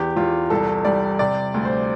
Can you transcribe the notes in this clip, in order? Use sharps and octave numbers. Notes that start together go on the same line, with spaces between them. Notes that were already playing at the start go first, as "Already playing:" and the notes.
Already playing: E2 G4
E2 F4
C2 A4
G3 D5
C3 D5
D2
C5